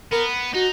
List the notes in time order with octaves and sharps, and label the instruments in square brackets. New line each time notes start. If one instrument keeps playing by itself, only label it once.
[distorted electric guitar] B3 [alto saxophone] A#4
[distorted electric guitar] D#4 [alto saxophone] F#4